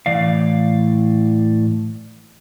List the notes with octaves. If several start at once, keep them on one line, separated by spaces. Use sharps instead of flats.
A2 E3 D5 F5